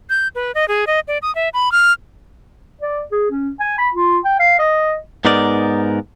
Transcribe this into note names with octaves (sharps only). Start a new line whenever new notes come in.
G6
B4
D#5
G#4
D#5
D5
D#6
E5
B5
F6
D5
G#4
C#4
G#5
B5
F4
G5
F5
D#5
G#2 B3 D#4 A#4 D5